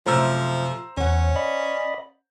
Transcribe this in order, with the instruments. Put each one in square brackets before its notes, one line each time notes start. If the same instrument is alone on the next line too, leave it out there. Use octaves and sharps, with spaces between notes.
[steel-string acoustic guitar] F#2 C3 A3 [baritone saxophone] F3 [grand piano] C5 A#5 E6
[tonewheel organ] E2 [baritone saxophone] C#4 [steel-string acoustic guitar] C#5 F#5
[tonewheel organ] D5 D#5 B5